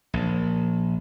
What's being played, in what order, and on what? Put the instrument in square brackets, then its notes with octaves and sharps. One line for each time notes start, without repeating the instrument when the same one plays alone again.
[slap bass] A#1